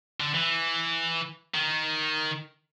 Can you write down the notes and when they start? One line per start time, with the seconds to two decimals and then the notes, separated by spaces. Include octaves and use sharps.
0.20 D3
0.34 E3
1.55 D#3